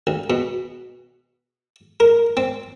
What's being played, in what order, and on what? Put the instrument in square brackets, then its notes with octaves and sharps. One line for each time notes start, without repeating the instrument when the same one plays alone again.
[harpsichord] D2
B2
A#4
C4